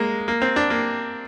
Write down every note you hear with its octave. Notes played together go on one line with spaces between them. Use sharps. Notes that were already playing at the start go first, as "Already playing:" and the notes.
Already playing: G#3 A#3
A#3
C4
D4
A#3